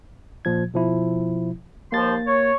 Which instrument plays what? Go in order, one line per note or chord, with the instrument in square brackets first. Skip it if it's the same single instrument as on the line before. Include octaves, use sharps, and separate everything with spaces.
[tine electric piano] A#2 F3 G#6
B2 F3 E4
[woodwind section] D#2 F3 C6 [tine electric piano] A#3 A6
[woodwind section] C#5